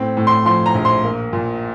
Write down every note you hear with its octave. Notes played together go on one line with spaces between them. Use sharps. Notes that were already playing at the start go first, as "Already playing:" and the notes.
Already playing: A2 C4
A2
C6
F3 C6
A#5
A#1
C6
A#3
A#2